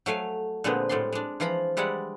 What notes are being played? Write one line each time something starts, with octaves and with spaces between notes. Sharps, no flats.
F#3 A3 F5 G#5
A#2 D3 G#3 B3 C4 B4
A2 G3 G#3 D5 C6
G#3 D4
E3 F3 F4 A#5 B5
G3 G#3 E4 D5 F#5